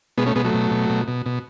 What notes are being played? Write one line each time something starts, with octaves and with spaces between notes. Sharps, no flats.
B2 G#3 B3
A3 C#4
B2 G#3 B3
F#3 A3
B2
B2
B2
B2
B2